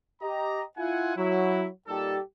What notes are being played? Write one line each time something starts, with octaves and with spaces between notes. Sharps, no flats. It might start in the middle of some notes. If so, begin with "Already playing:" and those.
G4 D#5 A#5
E4 F4 F#5 G#5
F#3 E4
A#2 G3 D#4 G4 A4